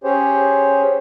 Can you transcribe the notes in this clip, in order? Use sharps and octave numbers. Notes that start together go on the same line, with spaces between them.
C#4 G4 G#4 C5 C#5